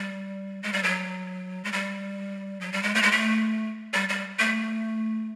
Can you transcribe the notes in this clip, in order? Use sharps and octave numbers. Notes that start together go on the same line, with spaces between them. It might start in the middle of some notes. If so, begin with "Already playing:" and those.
Already playing: G3
G#3
G3
F#3
G#3
G3
F#3
G3
G#3
A3
G#3
A3
G3
G3
A3